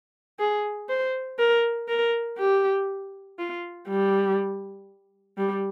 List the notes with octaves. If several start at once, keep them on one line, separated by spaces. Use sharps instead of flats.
G#4
C5
A#4
A#4
G4
F4
G3
G3